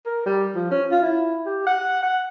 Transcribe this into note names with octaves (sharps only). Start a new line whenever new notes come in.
A#4
G3
F3
C#4
F4
E4
G4
F#5
F#5